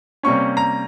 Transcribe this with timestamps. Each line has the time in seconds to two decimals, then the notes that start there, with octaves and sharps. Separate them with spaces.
0.23 C3 G3 A#3 C#4 C#6
0.57 A#5